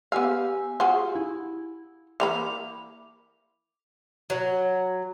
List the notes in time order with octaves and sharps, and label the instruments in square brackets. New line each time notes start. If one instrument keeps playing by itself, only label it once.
[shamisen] B3 F5 [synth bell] G4 G#5 E6
[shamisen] F4 F#4 G#4
[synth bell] E4
[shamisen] E3 A#3 B5 [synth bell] D6 F7
[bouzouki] F#3